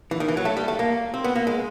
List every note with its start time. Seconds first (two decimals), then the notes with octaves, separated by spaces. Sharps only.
0.11 E3
0.20 D#3
0.28 E3
0.37 F#3
0.45 A3
0.57 G3
0.68 A3
0.79 A#3
1.14 C4
1.24 B3
1.36 A#3
1.47 G#3